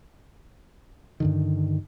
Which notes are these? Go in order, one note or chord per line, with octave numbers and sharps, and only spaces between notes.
G2 D3 D#3